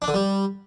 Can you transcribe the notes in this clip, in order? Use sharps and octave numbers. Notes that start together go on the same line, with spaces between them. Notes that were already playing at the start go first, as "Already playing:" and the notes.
D4
D3
G3